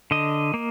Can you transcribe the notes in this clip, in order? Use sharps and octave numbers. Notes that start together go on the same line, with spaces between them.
D3 D#5
A#3